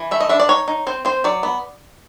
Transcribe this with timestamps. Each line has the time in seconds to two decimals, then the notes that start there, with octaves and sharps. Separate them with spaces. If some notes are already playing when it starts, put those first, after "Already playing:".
Already playing: E3
0.11 A3 E5
0.20 D#5
0.29 D4 E5
0.40 D5
0.49 D#4 C#5
0.68 D#4
0.87 C4 C5
1.05 C4 C5
1.24 F#3 D5
1.43 B3